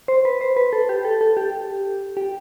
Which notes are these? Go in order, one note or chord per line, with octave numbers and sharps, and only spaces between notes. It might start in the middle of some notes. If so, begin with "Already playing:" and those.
C5
B4
C5
B4
A4
G4
A4
A4
G4
G4